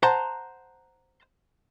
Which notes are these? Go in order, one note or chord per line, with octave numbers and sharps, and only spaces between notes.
C5 F#5 A5 A#5 C6